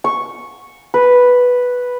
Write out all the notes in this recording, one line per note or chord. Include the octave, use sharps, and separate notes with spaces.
C#6
B4